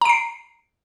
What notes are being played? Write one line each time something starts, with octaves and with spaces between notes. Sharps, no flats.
A#5 C7 D7